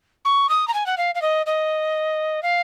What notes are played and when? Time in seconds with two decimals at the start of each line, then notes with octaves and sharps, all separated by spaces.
0.25 C#6
0.49 D#6
0.68 A#5
0.74 G#5
0.86 F#5
0.97 F5
1.15 F5
1.22 D#5
1.46 D#5
2.42 F5